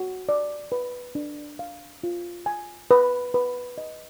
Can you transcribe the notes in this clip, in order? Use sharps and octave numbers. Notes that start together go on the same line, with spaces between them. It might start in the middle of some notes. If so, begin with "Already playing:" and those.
Already playing: F#4
D5
B4
D4
F5
F4
G#5
B4
B4
D#5